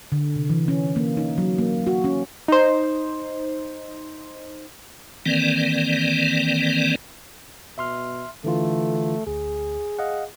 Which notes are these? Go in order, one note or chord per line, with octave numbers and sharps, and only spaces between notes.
D3
C3
E3
C#4
A#3
D#4
F#3
A#3
F#4
C#4
D#4 C5
D#3 E3 A#3 C4 D5
B2 E5 C6 F6
D3 E3 A3 F4
D2 G#4
D#5 F5 F#5